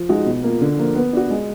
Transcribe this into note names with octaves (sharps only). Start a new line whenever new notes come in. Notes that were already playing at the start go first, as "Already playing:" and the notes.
Already playing: F3
G#3 D#4 F#4
B2
A#3 F4
D3
F3 A#3 F4
B3
D4 F#4
G#3